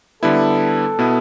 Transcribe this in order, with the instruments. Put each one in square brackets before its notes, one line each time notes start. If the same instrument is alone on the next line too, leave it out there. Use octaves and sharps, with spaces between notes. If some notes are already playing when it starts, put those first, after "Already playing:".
[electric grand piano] D3 G3 B3 E4 [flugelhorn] A4
[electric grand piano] B2 B3 E4